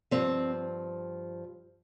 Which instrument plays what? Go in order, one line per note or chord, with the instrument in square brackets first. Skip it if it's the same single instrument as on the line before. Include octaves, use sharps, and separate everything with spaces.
[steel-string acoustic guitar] G2 F3 C4